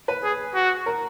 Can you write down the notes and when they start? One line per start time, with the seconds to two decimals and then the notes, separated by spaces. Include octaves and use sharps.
0.08 B4
0.24 G#4
0.55 F#4
0.86 A#4